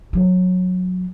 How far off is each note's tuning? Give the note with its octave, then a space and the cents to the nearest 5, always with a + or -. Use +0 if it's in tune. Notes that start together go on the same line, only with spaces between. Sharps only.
F#3 -20